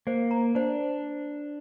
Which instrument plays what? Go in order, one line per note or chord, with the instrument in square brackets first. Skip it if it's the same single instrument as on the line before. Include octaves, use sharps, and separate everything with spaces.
[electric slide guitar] A#3 [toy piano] C5
[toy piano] A#5
[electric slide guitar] D4 [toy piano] C5